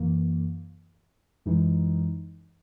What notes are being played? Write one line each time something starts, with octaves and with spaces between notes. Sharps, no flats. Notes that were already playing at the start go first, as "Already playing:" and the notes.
Already playing: F#2 E3 A#3
F#2 E3 G#3 D#4